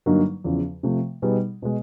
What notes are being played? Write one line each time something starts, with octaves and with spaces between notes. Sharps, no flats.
G2 D3 F#3 A#3 D#4
E2 C#3 F3
C3 F3 A3
B2 G3 B3 D#4 G#4
B2 G#3